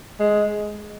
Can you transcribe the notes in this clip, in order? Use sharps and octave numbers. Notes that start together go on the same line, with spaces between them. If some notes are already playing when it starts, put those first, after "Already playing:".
G#3